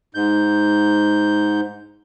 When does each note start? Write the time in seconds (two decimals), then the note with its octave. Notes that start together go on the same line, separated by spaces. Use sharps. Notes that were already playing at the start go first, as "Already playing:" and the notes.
0.15 G#2 G6